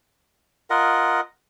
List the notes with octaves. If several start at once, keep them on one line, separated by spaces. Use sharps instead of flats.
F4 A#4 D#5 F#5